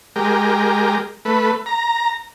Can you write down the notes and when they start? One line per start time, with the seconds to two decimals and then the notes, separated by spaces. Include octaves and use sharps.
0.16 G#3 G4 A#4
1.25 A3 B4
1.66 A#5